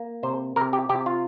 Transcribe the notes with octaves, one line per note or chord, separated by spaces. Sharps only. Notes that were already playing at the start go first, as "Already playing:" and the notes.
Already playing: A#3
C3 C5
C3 A#4
G4
C3 G4
F4